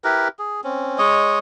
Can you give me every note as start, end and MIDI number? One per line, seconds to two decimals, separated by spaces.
0.04 0.28 64
0.04 0.28 67
0.04 0.28 70
0.04 0.28 71
0.39 0.61 68
0.64 0.98 60
0.64 0.98 61
0.98 1.39 56
0.98 1.39 73
0.98 1.39 75